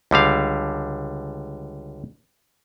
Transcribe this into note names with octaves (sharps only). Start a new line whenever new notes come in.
C#2 D3 G3 F5